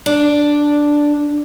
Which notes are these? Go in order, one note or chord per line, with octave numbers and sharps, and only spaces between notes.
D4